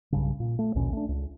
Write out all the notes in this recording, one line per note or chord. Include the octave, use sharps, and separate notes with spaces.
B1 G2 C#3
A#2
A3
A#1 D#2 B2 C#4
A3 D4
C#2